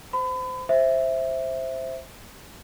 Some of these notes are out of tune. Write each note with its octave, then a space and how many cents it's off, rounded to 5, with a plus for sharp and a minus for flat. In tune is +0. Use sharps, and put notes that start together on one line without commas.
C5 -20 B5 +35
C5 +10 E5 +0